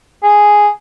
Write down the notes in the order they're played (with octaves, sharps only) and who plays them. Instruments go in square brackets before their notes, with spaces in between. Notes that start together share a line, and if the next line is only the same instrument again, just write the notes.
[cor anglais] G#4